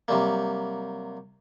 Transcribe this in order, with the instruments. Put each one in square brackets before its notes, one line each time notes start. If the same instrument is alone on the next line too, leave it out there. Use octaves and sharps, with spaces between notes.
[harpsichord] C3 F#3 G3 A#3